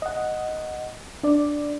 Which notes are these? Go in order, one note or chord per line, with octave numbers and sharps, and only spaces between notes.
D#5 F#5
D4 D5